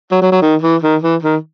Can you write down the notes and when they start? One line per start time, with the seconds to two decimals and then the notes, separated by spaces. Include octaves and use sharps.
0.11 F#3
0.22 F#3
0.32 F#3
0.42 D#3
0.62 E3
0.82 D#3
1.02 E3
1.22 D#3